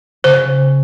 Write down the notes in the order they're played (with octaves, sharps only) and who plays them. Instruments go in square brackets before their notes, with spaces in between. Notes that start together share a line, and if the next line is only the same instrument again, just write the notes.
[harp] C#3 [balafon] C5